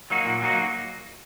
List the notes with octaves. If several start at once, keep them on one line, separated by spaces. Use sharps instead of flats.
F#3 A#3 D#4 F#4
A#2
F#3 A#3 D#4 F#4